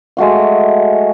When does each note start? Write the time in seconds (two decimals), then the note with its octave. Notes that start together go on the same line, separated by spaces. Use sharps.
0.17 G#3 A3 F#4 F5